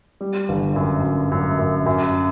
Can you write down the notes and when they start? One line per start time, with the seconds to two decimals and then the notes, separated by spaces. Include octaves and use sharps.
0.21 G3
0.49 G1
0.76 F#2
1.03 F#2
1.32 F#2
1.59 F#2
1.86 F#2